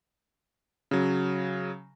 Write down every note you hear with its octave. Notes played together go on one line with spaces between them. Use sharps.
C#3 F#3